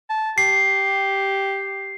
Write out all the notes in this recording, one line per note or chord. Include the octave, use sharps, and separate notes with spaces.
A5
G4 C7